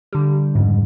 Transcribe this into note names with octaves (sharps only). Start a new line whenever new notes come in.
D3 G3
F2 G#2 C#3